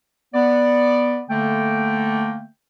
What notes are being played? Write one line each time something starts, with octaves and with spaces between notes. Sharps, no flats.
B3 D5
D3 A3 A#3 G5